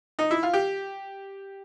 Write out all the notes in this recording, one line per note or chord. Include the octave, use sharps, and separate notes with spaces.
D#4
E4
F4
G4